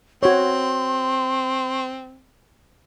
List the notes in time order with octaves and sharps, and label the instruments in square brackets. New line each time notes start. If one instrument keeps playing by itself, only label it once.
[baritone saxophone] C4 [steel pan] F#4 C#5 [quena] C6